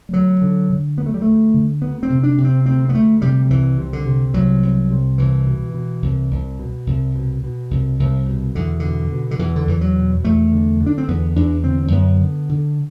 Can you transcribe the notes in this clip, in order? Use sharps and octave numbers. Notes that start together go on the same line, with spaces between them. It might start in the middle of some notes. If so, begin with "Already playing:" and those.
G3
D2 F#3
D3
D3
D2 B3
A3
G3
D2 A3
D3
D2 B3
C4
C3
D4
C3
C4
D2 C4
B3
D2 A3
C3 G3
C2 E3
C3
D3
C3
C2 F#3
C2
C3
C2 E3
B2
B2
C2
C2
B2
C2
B2
B2
C2
C2
B2
E2 D3
B2 D3
B2
D3
E2 E3
D3
E2 E3
F#3
B2
E2 A3
D3
D3
D4
C4
E2 B3
E2 D4
D3 C4
C4
F#2 B3
D3
D3